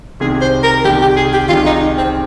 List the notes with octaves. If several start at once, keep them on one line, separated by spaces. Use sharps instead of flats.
C2 C3 D#3 G#3 G#4
C5
A#4
C2 C3 D#3 G#3 G4
G4
G#4
G4
C2 C3 D#3 G#3 F4
D#4
C4